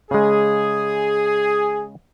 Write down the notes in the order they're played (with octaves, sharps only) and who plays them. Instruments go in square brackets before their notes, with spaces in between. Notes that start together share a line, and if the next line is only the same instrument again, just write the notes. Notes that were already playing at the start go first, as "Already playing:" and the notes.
[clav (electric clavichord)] C#3 G#3 [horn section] G#4